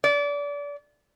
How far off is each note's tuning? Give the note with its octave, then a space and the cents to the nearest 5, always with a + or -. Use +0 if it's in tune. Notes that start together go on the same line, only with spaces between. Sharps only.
D5 -30